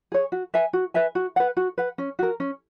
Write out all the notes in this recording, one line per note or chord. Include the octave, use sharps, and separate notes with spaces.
G#4 C#5
F#4
B4 E5 G#5
F#4
B4 E5 G#5
F#4
B4 F#5
F#4
B4 F#5
C#4
F#4 A#4
C#4